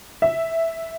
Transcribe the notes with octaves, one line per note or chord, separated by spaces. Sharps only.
E5